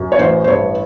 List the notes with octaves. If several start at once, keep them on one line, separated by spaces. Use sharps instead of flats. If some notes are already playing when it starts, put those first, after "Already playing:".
Already playing: F#2
C#5
A1 C5
C5
G2 C#5